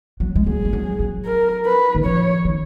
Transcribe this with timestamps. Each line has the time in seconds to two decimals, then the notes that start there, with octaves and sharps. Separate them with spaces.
0.20 F#3
0.35 G#3
0.47 F#3 G#4
0.65 G#3
0.73 F#3
0.99 F#3
1.25 A#4
1.65 B4
1.95 D#3
2.05 F3 C#5
2.45 D#3